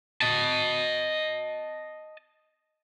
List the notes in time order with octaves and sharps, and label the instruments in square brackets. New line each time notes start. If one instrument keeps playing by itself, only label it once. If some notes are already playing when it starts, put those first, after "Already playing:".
[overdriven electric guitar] D#5 A5